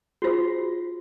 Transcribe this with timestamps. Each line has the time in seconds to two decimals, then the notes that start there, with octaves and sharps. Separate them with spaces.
0.22 F4 F#4 G#4 C5